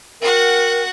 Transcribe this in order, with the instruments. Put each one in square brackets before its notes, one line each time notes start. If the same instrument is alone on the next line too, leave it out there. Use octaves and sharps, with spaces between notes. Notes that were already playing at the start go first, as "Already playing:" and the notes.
[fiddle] F#4 F#5 [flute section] A#4 G5